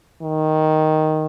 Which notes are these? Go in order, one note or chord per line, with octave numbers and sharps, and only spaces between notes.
D#3